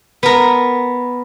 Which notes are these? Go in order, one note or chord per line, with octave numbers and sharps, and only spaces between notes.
B3 A#4